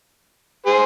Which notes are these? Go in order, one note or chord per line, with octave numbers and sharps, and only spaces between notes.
G#4 C5